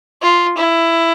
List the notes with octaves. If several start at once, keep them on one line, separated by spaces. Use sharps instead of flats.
F4
E4